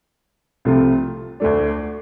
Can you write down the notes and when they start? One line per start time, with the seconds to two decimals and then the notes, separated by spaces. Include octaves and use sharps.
0.65 C2 C3 F3 A3 F4
1.40 D2 D3 A3 D4